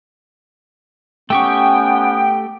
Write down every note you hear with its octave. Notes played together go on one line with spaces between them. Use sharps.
A3 B3 C#4 G4 G5 C#6